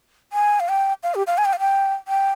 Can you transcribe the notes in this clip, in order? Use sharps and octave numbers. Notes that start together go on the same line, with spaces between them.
G#5
F5
G5
F5
G4
F5
G#5
G5
F5
G5
G5